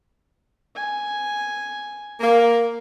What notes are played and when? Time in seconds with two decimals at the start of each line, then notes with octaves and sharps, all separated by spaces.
0.76 G#5
2.21 A#3